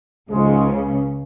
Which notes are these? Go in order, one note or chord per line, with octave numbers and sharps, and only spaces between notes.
C#2 G#2 C#3 F3 G#3